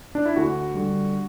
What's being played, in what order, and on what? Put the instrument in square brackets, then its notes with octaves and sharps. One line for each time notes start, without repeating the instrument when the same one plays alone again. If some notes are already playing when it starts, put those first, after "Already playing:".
[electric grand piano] D4
E4
D2 F#4
D3 G3